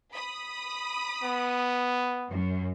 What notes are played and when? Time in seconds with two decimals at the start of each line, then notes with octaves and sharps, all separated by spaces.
0.12 B5 D#6
1.23 B3
2.30 F#2